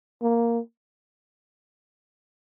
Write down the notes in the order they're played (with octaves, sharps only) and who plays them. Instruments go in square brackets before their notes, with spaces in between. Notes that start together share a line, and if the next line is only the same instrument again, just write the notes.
[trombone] A#3